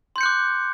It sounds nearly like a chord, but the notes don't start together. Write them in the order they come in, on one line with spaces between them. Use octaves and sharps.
C6 G6 C#7 F#6 D6